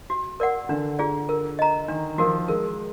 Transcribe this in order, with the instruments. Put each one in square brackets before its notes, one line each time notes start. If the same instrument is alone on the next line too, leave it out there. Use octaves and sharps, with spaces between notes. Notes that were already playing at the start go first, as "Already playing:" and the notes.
[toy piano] F#4
A#4 D5 F#5
[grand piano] D3 [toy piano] D4
[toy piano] F4 G#4 D5
A#4
D#5 A#5
[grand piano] D#3 [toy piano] D4
[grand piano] F3 [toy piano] F#4 A#4
[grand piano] G#3 [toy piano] A#4